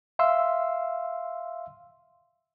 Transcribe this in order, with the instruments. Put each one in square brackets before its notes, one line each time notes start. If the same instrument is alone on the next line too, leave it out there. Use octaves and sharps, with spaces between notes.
[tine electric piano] E5 F5 C6 E6